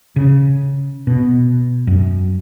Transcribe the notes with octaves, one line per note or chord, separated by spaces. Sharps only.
C#3
B2
F#2